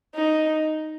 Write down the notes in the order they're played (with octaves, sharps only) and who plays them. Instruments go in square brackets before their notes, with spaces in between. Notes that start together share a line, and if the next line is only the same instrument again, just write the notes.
[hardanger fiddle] D#4